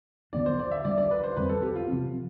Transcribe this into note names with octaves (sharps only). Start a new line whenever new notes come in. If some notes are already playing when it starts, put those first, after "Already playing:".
D3 F3 B3 D4 D5
C5
D5
E5
D3 G3 D4 D5
D5
B4
C5
F2 D3 G3 C4 B4
A4
G4
F4
C3 F3 C4